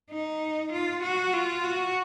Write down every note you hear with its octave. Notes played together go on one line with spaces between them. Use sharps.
D#4
F4
F#4
F4
F#4